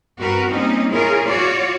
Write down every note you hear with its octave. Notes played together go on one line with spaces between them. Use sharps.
G2 C4 F#4 A#4 B4
G3 A#3 C4 C#4 D#4
E4 F4 G#4 A#4 C#5
F4 F#4 C#5 D5